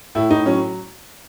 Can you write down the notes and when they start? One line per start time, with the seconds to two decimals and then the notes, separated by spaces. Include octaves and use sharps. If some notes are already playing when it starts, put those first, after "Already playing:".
0.15 A2 E4
0.30 A2 D#4
0.46 F#3 C#4